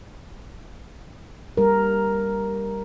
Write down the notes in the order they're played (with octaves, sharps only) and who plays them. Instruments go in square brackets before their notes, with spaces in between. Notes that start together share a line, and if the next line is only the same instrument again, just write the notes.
[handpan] G3 A#4